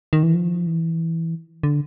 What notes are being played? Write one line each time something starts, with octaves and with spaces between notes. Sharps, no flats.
D#3
E3
F3
E3
D3